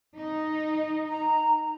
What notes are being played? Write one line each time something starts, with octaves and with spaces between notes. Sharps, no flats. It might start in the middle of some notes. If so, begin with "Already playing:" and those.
D#4
A#5